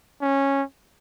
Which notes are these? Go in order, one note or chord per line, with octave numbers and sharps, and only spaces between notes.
C#4